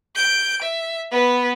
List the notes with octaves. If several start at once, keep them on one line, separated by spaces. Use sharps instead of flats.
G6 D7
E5
B3 B4